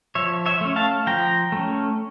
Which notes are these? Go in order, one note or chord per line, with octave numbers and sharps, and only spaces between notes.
F3 C#5 E5
C#5 E5
A3 C#4
F5 A5
F3 G5 A#5
A3 C#4